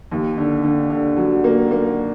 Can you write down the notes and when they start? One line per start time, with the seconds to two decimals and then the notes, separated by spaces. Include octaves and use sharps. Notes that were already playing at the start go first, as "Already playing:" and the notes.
0.12 D#2
0.37 D3
0.64 D3
0.90 D3
1.17 F#3
1.44 A#3
1.71 A#3